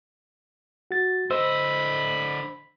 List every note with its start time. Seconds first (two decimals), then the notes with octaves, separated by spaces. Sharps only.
0.91 F#4 A6
1.31 D3 C5 D#5 B5 E6